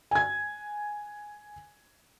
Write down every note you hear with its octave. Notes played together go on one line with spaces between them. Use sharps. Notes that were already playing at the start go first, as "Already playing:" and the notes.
G#5 G#6